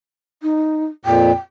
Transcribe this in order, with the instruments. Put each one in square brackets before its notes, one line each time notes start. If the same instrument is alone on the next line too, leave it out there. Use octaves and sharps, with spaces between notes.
[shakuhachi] D#4
[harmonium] F2 A#2 [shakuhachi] G5